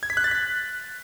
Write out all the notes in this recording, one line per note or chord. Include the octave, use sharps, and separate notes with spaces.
G#6
B6
F#6
A6
B6